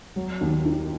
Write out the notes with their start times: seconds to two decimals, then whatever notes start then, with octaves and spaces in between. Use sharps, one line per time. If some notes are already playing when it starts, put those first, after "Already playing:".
0.16 F#3
0.41 D#2
0.65 D#3